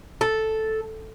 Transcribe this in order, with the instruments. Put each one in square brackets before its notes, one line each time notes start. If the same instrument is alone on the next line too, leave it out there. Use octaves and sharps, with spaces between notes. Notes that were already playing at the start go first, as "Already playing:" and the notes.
[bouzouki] A4